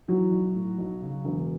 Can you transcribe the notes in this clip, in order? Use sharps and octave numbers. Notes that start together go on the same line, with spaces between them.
E3 F#3 F#4
B1
A2
B1
C#3
E1